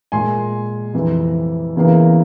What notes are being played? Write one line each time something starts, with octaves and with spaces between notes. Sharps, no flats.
A#2 G#3 G#5 C6
F2 C3 E3
E2 C#3 E3 A#3